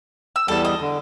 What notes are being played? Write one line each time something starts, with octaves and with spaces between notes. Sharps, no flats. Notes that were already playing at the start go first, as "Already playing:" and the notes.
E6
E2 G3 A4 A5
D#5
D3